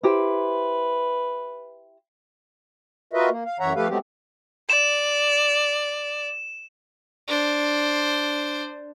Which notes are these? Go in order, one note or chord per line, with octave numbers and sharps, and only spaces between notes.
E4 G4 B4 C5
F4 F#4 A#4 B4 D#5 E5
A#3
F5
F#2 E3 C#5 E5 F#5 A#5
F3 A3 G4 A4 B4 F5
F#3 G#3 A3 B3 C4 G4
D5 E7
D4 C5